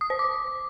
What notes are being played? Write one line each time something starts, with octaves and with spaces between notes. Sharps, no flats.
D#6
C5
D6